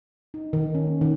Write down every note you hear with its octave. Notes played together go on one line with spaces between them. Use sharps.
D#4
D#3
C#4
A#3
D#3